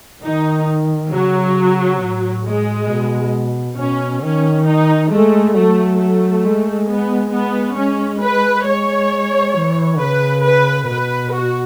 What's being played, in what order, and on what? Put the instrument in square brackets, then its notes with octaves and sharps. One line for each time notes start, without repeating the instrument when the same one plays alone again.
[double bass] D#3 [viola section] D#4
[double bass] C#3 [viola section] F#3
[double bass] A2
[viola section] G#3
[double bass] B2
[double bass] B2 [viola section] C#4
[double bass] D#3 [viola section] C#4
[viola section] D#4
[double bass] G#3 [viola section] A3
[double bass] F#3 [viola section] A3
[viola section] A3
[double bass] G#3
[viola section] B3
B3
[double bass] G#3 [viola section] C#4
[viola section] B4
[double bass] G#3 [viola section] C#5
[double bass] E3
[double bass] C#3 [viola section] B4
[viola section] B4
[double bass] B2 [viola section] B4
[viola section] F#4